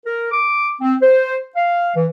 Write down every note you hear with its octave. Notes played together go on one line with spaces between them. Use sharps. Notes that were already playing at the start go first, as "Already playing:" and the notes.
A#4
D6
C4
C5
F5
E3